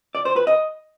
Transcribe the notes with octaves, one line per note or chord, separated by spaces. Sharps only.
D5
C5
B4
D#5